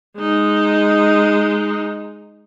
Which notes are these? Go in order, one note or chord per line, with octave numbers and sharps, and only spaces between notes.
G#3 D#4